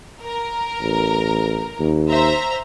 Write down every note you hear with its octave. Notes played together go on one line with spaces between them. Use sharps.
A#4
A1
D#2
C5 E5 A#5